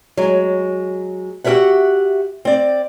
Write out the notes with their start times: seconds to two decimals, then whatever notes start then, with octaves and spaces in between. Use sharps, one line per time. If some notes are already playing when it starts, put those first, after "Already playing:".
0.17 F#3 G#3
1.44 F#4 G4 A#4 C#5 E5 F#5
2.45 C4 D5